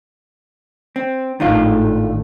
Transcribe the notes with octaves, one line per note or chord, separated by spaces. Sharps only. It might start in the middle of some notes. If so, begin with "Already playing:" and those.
C4
G#1 A2 D#3 A3 D4 F4